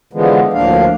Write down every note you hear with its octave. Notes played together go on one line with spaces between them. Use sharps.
D3 E3 F3 G#3 B3
D2 A2 F3 A#3 D4 F5